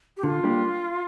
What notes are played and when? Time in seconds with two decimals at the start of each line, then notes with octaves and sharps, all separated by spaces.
0.17 G4
0.23 D3 F4
0.43 G3 A#3 D4 G4